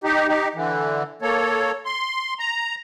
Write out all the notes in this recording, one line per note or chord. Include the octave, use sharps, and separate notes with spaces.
D#4 G4
D#4 G4
D3 E3
A#3 A4 C#5
C6
A#5